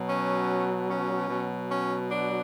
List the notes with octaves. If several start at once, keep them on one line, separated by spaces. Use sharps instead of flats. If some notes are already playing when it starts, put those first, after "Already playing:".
Already playing: B2 F#3
C#4
C#4
B2 F#3
C#4
D4